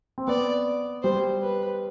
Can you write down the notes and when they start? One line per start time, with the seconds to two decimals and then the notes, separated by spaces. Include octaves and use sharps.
0.18 C4
0.28 B3 D5
1.03 G3 C5
1.42 B4